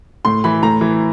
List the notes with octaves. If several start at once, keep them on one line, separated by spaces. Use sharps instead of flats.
A2 C6
E3 B5
A2 A#5
E3